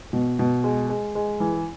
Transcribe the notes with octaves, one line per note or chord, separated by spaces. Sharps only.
B2
B2
G#3
G#3
G#3
E3